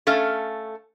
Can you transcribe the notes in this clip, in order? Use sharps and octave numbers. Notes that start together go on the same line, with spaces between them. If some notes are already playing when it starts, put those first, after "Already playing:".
A3 C#4 A4 F5